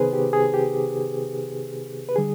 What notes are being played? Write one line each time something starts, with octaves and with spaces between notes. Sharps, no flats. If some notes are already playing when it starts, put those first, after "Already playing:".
Already playing: C3 D#3 B3 D#4 G#4 B4 C5
G4
G#4
G4
B4
D3 G3 G#4